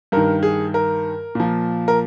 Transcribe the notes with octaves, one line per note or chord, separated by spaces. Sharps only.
G2 D#3 A#4
G#4
A#4
A#2 F3
A#4